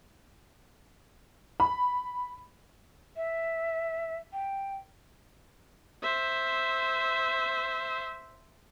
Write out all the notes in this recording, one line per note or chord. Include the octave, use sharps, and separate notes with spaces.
B5
E5
G5
C5 E5